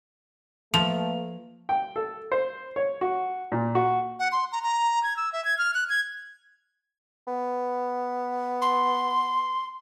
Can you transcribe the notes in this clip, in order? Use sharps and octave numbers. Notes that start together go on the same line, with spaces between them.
F3 A3 A#3 B4 F5 F7
G5
A4
C5
C#5
F#4
A#2
F#4
F#5
C6
A#5
A#5
G#6
E6
E5
G#6
F6
F#6
G#6
B3
C6